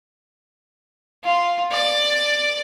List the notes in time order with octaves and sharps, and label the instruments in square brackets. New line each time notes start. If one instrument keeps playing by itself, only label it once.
[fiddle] F4
D5